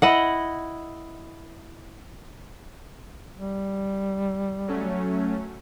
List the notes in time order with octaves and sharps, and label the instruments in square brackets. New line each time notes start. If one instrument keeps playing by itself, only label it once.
[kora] E4 D#5 F#5
[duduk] G3
[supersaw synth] F#3 A3 C#4